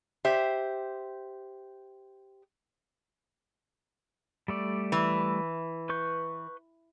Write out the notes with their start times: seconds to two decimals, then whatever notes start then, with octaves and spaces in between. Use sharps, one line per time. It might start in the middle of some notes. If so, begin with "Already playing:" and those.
0.25 G4 C5 E5
4.48 G3 A3 D5
4.92 E3
5.89 B4 C#6 G6